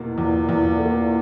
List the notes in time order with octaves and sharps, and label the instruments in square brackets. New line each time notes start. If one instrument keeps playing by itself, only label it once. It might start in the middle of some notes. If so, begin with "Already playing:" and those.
Already playing: [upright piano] E2 B2 A#3
[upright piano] E2 [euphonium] A#2
[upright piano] E2
A#3